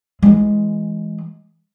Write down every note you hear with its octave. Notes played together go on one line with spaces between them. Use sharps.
E3 G#3